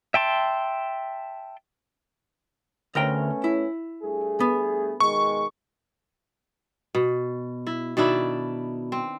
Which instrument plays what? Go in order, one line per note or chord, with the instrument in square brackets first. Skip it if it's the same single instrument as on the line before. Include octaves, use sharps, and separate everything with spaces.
[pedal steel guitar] E5 G5 A5 C6
[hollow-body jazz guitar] D2 A#4 G5 [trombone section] A3 B3 C#4
[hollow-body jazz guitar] E4
[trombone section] G2 A3 G#4
[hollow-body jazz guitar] B3
[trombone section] B2 D#3 G#3 [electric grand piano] C#6
[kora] B2
E4
B2 D#3 D4 E4
C4